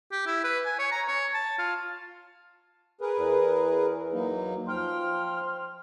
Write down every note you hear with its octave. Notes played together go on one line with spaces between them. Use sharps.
G4
E4
B4
G#5
C#5
A#5
C#5
A5
F4
G#4 A#4 B4
E2
F#3 A#3 D#4
F3 G5 C6 F6